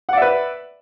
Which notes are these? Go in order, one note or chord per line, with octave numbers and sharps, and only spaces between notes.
B4 D5 E5 F#5